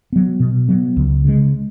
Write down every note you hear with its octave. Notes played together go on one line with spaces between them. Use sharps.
F#3 B3
B2
F#3 B3
C#2
C#3 G#3